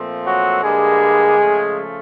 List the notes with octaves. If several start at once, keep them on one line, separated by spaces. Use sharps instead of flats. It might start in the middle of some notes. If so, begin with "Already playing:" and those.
Already playing: A#2 F3 A3 C4
F#3 F#4
G2 D3 G3 G#3 A#3 G#4
C#3 F3 A3